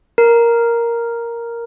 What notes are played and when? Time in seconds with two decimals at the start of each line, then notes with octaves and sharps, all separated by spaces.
0.18 A#4